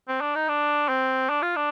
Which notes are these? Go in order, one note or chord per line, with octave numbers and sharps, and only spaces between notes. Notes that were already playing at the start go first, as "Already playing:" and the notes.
C4
D4
D#4
D4
C4
D4
F4
D4